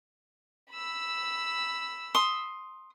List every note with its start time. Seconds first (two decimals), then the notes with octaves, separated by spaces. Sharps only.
0.71 B5 E6
2.14 C6 D#6